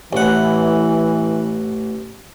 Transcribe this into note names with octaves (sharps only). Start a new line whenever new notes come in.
A1 E3 F#5